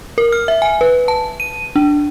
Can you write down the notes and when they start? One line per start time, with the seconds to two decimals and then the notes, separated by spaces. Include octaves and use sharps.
0.18 A#4
0.33 F6
0.48 E5
0.62 G#5
0.81 B4
1.08 A5
1.40 D#7
1.76 D4